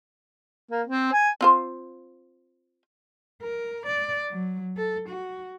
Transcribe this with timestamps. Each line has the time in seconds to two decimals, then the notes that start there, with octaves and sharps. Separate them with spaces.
0.71 A#3
0.87 C4
1.13 G#5
1.41 C4 F4 C5
3.42 A#4
3.86 D5
4.30 F#3
4.77 A4
5.09 F#4